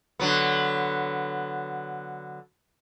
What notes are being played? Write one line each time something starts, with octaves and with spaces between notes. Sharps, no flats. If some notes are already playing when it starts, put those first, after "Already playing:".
D3 F#3 B3